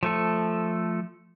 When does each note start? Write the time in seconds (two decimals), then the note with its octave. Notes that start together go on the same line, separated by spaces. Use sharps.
0.03 F3 A3 A4